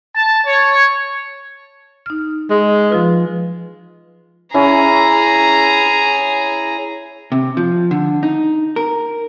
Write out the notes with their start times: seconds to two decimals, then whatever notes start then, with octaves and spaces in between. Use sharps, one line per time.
0.16 A5
0.47 C#5
2.06 D#4 F6
2.50 G#3
2.90 F3 F4 B4
4.54 C#4 E4 G#4 A#5
7.32 C3
7.57 F3
7.91 D3
8.23 D#4
8.76 A#4